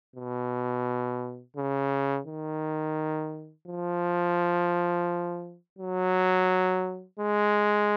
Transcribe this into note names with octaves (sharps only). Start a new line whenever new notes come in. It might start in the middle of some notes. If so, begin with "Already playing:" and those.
B2
C#3
D#3
F3
F#3
G#3